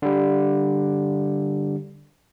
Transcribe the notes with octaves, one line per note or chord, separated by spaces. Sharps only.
D3 G3